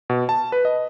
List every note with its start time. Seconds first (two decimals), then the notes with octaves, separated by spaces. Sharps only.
0.10 B2
0.29 A5
0.52 B4
0.65 D#5